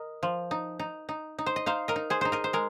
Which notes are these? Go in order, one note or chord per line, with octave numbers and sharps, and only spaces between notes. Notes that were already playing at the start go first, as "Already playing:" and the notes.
Already playing: A#4 D#5
F3
D#4
D#4
D#4
D#4
C5
D#5
D#4 C5 F5
A#4 D#5
D#4
G#4 C5
D#4 C5
A#4 D#5
C5
G#3 A#4